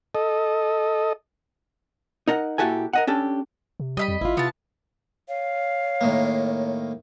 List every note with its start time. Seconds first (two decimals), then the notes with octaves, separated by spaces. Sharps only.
0.15 A4 D#5
2.27 D#4 A#4 D#5 F#5
2.58 A#2 E4 F#4 G4 A4 G#5
2.93 A#4 D#5 F#5
3.07 C#4 D4 G4 A4
3.80 C3
3.97 G3 D#5 E5 B5
4.08 F2
4.21 G#1 E4 F4
4.37 C3 B3 A5
5.28 C#5 F5
6.01 A2 D#3 A#3